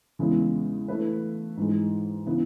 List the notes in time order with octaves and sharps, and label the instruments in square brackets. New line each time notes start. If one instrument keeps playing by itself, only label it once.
[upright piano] E2 C#3 G#3 B3 E4
A3 E4 B4
G#2 E3 G#3
C#3 E3 B3 E4